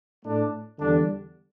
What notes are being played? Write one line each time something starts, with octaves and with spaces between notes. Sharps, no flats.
A2 A3 D4
E2 D3 G3 D4